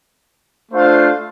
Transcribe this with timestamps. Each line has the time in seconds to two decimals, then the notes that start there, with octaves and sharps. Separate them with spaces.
0.70 A3 D4 F4 C5 F5